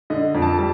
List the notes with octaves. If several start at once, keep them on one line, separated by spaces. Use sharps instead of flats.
D3 D#5
F2
A5
G3 A5